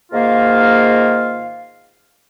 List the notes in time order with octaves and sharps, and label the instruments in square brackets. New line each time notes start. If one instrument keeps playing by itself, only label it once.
[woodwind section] G#2 D#3 A#3 F4 A#4 F5